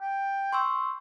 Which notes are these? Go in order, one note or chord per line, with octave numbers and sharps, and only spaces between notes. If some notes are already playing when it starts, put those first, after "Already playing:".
G5
C6 C#6 E6